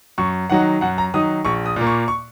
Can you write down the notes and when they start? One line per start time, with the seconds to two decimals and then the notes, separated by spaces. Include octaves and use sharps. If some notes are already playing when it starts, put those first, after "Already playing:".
0.18 F#2 C#6
0.50 D#3 F#3 D#4 F#5
0.81 F#2 F#5
0.98 A#5
1.14 D#3 F#3 D#4 D#6
1.45 A#1 C#6
1.66 D#6
1.76 A#2 A#3
1.87 C#6
2.08 C#6